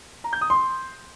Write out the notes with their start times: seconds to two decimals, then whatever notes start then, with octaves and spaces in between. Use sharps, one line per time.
0.24 A#5
0.33 G6
0.41 D#6
0.50 C6